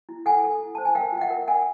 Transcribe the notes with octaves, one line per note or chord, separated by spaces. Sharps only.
E4
A4 F#5 G#5
A4
E4
C5 A5
G#5
A#4 F5 G5
F4 G5
E5 F#5
A#4
A#4 F#5 G#5